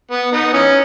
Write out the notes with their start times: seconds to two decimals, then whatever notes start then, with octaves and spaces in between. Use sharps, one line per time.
0.11 B3
0.32 B3 D#4
0.53 E3 C#4